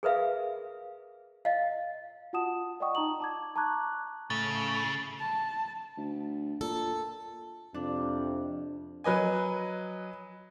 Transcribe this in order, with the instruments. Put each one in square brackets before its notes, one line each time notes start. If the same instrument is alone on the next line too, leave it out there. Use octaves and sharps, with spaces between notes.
[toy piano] G#4 A#4 B4 E5 F5
D#5 F5
[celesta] F4 F#4 F#5 A5 D#6 E7
D5 D#5 F#5 G5 C#6 D#6
D#4 A5 A#5 D#6 F#7
A5 D6 G#6
A5 A#5 C#6 D6 F#6 G#6
[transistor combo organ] A2 [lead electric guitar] C#3 [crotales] A6
[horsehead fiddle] A5
[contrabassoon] D2
[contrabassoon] A#2 [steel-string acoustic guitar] A4
[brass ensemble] F2 C3 [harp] D4
[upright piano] F#3 B4 D#5 G#5